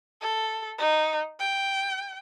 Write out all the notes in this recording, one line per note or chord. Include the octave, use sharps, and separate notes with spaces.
A4
D#4
G5